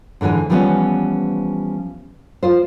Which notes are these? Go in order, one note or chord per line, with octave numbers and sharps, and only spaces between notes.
G#2 D3 E3 G#3 G#5
E3 F3 G3 A#3 B3 C#4
F4 C5